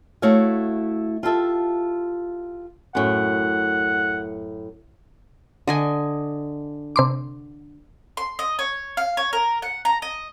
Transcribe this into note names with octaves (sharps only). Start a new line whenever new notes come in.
A3 E4 F#4 C#5 F5
F4 G4 A4 E5
F#2 A2 F#5
D3 D#5 G#5
C3 C6 D6
C6
D#5
C#5
F5
C#5
A#4
F#5
A#5
D#5